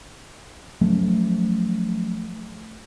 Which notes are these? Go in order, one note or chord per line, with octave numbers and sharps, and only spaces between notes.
F3 F#3 A3 C#4